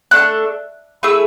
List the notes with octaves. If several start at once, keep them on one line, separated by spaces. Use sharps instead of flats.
A3 D4 A4 F#6
A3 E4 G#4 E6